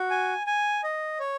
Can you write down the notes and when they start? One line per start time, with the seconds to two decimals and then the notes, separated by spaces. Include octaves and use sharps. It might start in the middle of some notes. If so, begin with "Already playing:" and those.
Already playing: F#4
0.11 G#5
0.47 G#5
0.84 D#5
1.20 C#5